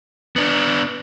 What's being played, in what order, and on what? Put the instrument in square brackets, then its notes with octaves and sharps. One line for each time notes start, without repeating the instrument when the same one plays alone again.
[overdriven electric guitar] B3 D4